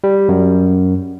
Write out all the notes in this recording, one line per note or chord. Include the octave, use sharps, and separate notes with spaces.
G3
F#2